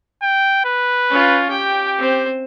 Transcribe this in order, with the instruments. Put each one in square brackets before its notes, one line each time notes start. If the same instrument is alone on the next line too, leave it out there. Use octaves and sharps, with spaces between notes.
[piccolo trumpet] G5
B4
[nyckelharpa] C#4 F4
[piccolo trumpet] G4 [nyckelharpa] G5
[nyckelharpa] C4 C5